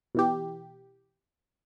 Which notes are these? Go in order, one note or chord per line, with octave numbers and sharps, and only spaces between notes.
B2 E3 G4